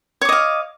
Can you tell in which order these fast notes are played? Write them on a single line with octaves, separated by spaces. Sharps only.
C#5 D6 D#5 F5